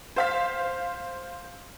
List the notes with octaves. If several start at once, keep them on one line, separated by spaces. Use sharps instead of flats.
C5 F5 B6